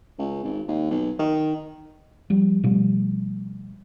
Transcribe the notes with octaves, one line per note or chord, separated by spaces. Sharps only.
C#2
G#1
D#2
B1
D#3
F3 G3
B2 F3 G3 A3